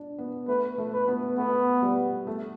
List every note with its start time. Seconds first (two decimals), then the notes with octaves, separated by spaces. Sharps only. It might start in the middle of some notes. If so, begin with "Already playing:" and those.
Already playing: D4
0.18 B3
0.48 A3 B4
0.78 A3
0.93 B4
1.08 B3
1.37 A3 B3
1.82 G3
2.27 A3